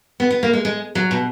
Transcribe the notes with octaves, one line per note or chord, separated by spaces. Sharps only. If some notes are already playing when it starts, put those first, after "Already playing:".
B3
B3
A#3
G#3
G#3
F#3
B2